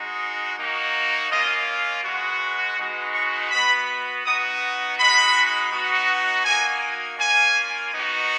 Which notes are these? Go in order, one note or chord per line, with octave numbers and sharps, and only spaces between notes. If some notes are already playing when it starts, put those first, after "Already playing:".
Already playing: G#3 D#4 F#4
A#3 D#4 F#4
A#3 C#4 F4 D#5
G#3 B3 F#4
G#3 B3 D#4 F#4
C#6
B3 F#4 B5
B3 D#4 F#4 D#6
G#3 D#4 F#4 B5
B3 D#4 F#4
A#3 D#4 F#4 G#5
A#3 C#4 F4 G#5
B3 D#4 F#4